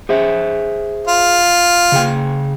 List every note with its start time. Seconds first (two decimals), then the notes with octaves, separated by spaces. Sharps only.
0.09 G#4 C5 E5
1.07 F4
1.92 C#3 G#4 G5